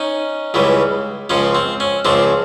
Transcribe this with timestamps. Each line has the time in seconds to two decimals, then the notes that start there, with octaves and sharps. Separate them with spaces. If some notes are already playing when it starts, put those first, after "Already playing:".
Already playing: C#4 D#4
0.54 C#2 C#3 E3 G3
1.30 C#2 C#3 F3 C#4
1.55 C4
1.80 C#4
2.05 C#2 C#3 F3 C4 D4